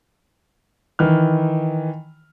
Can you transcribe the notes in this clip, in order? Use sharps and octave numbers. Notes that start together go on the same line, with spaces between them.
D#3 E3 F6